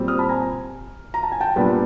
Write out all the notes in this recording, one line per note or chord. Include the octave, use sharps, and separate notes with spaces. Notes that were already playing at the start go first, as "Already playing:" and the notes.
Already playing: A#2 G3 C4
D#6 F6
A5 B5
G#5 A#5
A#5
A5
G#5
G5 A5
A#2 G3 B3 D4